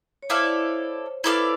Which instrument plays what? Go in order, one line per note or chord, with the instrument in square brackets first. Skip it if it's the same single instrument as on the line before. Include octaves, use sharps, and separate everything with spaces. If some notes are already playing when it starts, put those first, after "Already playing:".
[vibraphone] C#5
[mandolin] E4 A4 D5 F5 [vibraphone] C5
[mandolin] E4 A4 D5 F5 [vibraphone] B4